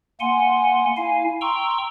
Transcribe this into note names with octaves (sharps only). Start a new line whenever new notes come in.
A#3 F#5 G#5 C6
E4 F5 G#5
G5 A#5 C6 C#6 E6